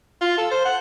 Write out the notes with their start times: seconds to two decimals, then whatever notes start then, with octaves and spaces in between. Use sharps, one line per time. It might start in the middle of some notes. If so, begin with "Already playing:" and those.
0.21 F4
0.38 A4
0.51 C5
0.65 F#5